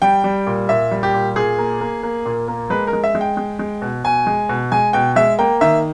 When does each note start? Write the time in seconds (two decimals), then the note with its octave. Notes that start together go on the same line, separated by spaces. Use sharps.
0.02 G3 G5
0.24 G3
0.47 A#2
0.69 A#2 E5
0.91 G3
1.03 G4
1.14 A#2
1.36 A#2 G#4
1.58 A#3
1.81 A#3
2.03 A#3
2.25 A#2
2.48 A#3
2.70 G#3 B4
2.87 A#4
2.93 G#3
3.04 E5
3.15 G#3
3.21 G5
3.37 G#3
3.59 G#3
3.82 B2
4.04 B2 G#5
4.27 G#3
4.49 B2
4.72 G#3 G#5
4.93 B2 G5
5.16 G#3 E5
5.39 A#3 G5
5.61 D#3 E5